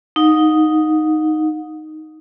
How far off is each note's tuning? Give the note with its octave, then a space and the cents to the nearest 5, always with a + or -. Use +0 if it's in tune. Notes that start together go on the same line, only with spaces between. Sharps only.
D#4 +0 F#5 -40